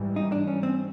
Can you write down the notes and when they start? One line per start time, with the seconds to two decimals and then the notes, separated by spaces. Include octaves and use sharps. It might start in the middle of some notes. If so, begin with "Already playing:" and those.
Already playing: G#2 E3 G3
0.16 D#4
0.32 D4
0.47 C#4
0.63 C4